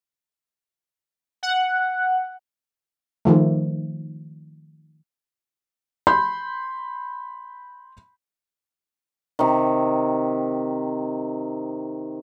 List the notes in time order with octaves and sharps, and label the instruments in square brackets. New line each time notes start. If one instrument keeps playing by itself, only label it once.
[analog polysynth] F#5
[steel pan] D#3 F3 A3
[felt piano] B5 C6 G6
[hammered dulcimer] C3 D#3